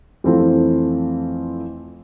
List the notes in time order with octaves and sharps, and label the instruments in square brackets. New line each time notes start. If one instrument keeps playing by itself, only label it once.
[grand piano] F2 E3 A3 C4 F4